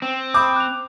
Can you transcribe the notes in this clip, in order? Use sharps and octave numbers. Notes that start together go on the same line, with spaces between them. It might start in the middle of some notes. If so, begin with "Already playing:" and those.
C4
B5 D6 D#6 G6
F#6 F7